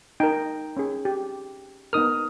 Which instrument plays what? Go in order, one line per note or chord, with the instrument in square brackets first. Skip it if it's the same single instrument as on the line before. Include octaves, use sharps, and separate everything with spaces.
[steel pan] D#4 A#4 [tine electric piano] G5
[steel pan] C#4 G#4
G4
[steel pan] B3 D#4 A#4 [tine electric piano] D#6 F6